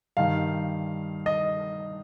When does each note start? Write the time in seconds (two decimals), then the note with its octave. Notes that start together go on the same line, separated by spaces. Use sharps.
0.17 G2 D#3 F5
1.26 D#5